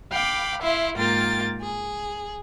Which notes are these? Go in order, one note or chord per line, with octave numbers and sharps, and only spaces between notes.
F5 G5 B5 D6
E4 E5 F5 C6
G#2 A#3 F4 A#4 G5 A6
G#4